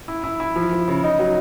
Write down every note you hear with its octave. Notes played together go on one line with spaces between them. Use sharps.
E4
E4
E4
F3
F3
C#3
D#4
F#3